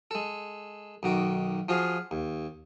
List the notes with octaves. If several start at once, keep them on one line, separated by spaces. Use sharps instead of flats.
G#3 A4
B1 D#3 F#4 D6
F3 F4 F#4 G#4
D#2